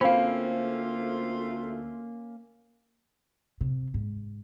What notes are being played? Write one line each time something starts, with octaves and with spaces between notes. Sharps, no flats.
D2 A3 A#3 C4 C#4 F4 F5 B5
C3
G#2